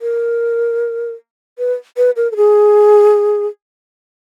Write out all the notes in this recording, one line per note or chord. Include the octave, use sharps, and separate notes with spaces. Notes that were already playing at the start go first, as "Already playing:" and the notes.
A#4
B4
B4
A#4
A4
G#4